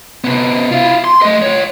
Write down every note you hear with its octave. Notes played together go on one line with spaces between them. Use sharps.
C3 B3
E4 F4
C6
A3 D#5
F4 C#5